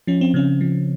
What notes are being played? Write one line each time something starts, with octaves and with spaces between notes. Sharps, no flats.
F3 C#4
C4
C#3 C#4
F3